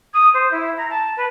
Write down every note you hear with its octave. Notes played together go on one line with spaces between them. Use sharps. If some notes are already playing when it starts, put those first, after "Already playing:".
D#6
C5
E4
A#5
A5
B4